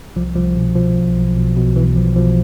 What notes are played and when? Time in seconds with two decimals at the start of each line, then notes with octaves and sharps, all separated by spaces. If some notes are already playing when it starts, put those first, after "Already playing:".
0.16 C2 F3
0.35 C2 F3
0.55 B2
0.76 B2 F3
0.96 B1
1.16 B1
1.37 B2
1.56 B2
1.76 B1 E3
1.96 B1 F3
2.16 B2 F3